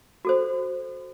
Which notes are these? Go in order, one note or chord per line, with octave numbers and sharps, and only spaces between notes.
F#4 A4 C5